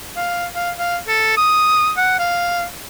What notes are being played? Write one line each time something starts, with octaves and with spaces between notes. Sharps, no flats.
F5
F5
F5
A4
D#6
F#5
F5